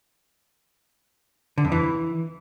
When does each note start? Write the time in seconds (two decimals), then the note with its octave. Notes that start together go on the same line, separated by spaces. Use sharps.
1.58 D3
1.65 F2
1.72 E3